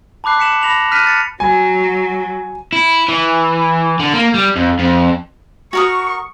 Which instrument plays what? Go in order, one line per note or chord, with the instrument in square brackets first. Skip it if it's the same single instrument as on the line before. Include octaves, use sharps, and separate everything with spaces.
[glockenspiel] A5 B5 D6 F#6 C7
B6 C#7 E7 F#7
B5 A#6 F7 F#7
F6 F#6 B6 C7 D#7
A6 C#7
[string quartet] F#3 [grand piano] G#5
[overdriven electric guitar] E4
E3
D3
A#3
G3
F2
F2
[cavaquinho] F#4 A#4 D#6 [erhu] C#6